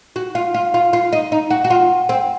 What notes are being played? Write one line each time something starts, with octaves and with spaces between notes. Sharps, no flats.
F#4
F4
F4
F4
F4
D#4
D#4
F#4
F#4
F4
C4